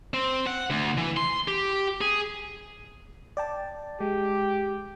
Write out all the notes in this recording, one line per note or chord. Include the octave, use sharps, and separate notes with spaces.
C4
F#5
D2
E3
C6
G4
G#4
D5 G5 A5
G#3 G4